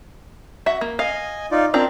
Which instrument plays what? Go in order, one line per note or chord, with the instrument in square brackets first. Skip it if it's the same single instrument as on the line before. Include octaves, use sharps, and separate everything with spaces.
[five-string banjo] F#4 E5
A#3
[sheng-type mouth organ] D#5 G#5 [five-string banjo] F5
[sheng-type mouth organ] D#4 F4 D5
[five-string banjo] C4 D4 F4 [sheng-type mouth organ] A#4 A#5